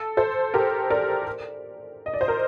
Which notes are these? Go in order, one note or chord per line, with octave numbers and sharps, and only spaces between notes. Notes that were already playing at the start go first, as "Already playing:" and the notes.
Already playing: A4
A4 C5
G4 A#4
A#4 D5
D#5
D5
C5
A#4